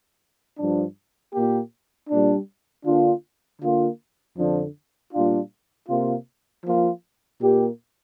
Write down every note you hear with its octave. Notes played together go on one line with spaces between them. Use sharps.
G2 F3 D4
A#2 A#3 G4
A#2 G3 D4
D3 A#3 D4 F4
D3 A#3 F4
F2 D3 F3 D4
A#2 G3 D4 F4
C3 A#3 F4
F3 A#3 F4
A#2 A#3 G4